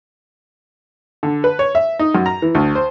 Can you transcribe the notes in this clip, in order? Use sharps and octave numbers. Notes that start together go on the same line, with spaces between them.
D3
B4
C#5
E5
D#4
F#2
A#5
E3
D2
C5